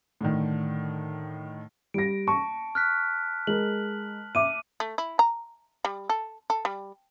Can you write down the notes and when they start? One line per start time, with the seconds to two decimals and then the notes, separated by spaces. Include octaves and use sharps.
0.21 A2 D3 D#3
1.94 G3 A#6 D7
2.27 A5 C#6
2.75 F6 F#6 B6
3.47 G#3 A#4 F#7
4.35 E5 D6 D#7
4.80 A3
4.98 E4
5.19 A#5
5.85 G3
6.09 A4
6.50 A4
6.65 G3